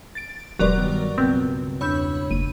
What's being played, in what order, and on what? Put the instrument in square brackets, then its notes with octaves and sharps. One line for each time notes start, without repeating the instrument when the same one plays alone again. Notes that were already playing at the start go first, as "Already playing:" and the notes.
[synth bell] A6 D7
[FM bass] E1 [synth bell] F#3 A#4 D5 [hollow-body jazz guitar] G4 B4 C6
[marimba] G2 G3 [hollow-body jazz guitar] D#3 B3
[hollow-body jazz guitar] C#2 B2 B3 [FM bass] C4 [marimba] G6
[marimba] E2 D4 G6 [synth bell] C#5 B5 E6
[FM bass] F#1 [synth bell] D#7